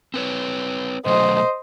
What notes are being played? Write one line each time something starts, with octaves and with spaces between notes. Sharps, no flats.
C4 B4 C#5
B2 F#3 A3 C5 D#5